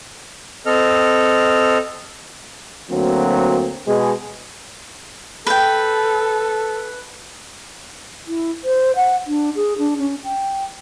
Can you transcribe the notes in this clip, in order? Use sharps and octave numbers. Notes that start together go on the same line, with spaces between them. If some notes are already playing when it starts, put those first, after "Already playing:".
C4 A4 D#5 F6
D2 F#3 A#3 C4
B2 G#3 G#4
A4 B4 G5
E4
C5
F#5
D4
G#4
D4
C#4
G5